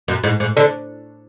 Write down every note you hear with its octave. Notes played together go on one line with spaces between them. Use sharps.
F#2
G#2
G#2
D3